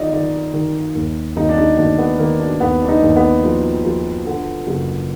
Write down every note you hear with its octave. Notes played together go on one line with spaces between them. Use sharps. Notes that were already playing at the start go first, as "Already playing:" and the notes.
Already playing: D#3 D#4 F4 D5 D#5
D#3 D5
D#3
D#2
D#2 D#4
D4
D#4
D#2 D4
B3
D#3 A#3
D4
D#2 B3
D4
D#4
D#2
B3
F3
F3
D3
F#1